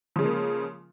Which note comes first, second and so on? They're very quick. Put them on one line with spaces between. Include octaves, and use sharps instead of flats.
F3 C#3 G#3 A#3